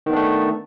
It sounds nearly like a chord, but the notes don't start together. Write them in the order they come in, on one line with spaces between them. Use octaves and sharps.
D#3 B3 D4 A3